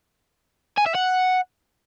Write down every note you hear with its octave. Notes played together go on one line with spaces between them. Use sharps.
G#5
E5
F#5